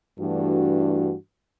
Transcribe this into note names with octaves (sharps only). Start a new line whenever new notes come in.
G2 E3 A3 D4 F#4